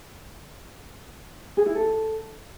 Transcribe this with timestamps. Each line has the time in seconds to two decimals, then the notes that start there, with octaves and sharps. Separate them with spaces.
1.57 G#4
1.66 E4
1.75 A4